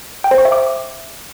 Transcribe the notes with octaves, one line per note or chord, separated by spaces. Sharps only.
G5
C5
C#6
E5
D6